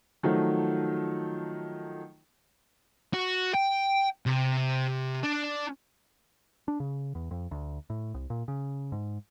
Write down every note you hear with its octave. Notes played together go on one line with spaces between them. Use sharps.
D#3 F3 F#3 A3
F#4
G5
C3
D4
D4
C#3
E2
F2
D2
A2
C2
A#2
C#3
G#2